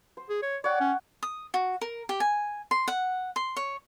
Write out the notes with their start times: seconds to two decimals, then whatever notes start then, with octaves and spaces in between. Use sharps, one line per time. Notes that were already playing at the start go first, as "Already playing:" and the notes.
0.17 C5
0.29 G#4
0.42 C#5
0.64 C#5 D5 F#5 G5
0.80 C#4
1.23 D#6
1.54 F#4
1.81 A#4
2.09 G4
2.20 G#5
2.71 C6
2.88 F#5
3.36 C6
3.57 C#5